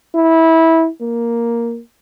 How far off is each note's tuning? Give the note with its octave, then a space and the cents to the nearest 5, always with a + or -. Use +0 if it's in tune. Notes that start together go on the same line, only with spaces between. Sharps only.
E4 -20
A#3 +5